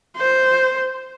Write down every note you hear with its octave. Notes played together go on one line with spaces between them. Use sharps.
C5